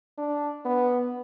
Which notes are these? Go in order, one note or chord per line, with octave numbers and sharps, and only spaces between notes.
D4
B3